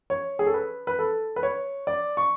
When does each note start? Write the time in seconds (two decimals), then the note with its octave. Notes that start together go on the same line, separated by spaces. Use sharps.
0.10 C#5
0.39 G#4
0.46 A4
0.54 B4
0.87 B4
0.99 A4
1.36 B4
1.43 C#5
1.87 D5
2.17 C#6